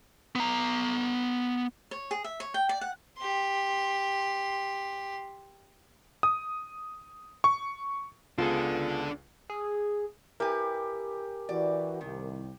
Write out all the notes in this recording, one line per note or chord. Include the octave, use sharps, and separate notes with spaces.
B3 A#5
C#5
G#4
E5
C#5
G5
D5
F#5
G4 C6
D#6
C#6
C#2 B3 D4 F4 G#4 A4
G#4
E4 G4 A#4 B4 G#5
E3 F#4 D5
C2 D#3